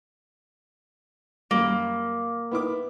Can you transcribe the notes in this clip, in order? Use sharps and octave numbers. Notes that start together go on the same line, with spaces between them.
F#2 G3 A#3
B3 E4 D6